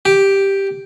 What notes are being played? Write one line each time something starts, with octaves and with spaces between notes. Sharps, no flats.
G4